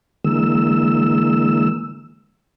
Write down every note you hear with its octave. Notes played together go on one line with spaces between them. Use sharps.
D3 E3 G#3 A#3 E6